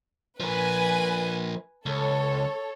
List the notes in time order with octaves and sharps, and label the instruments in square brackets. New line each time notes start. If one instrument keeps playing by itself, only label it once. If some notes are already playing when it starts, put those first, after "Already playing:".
[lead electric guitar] F3 A#4 [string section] B4 G#5
[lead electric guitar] C#2 [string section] A4 C#5